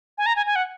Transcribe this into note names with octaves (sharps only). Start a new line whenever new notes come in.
G#5
A#5
G#5
G#5
F#5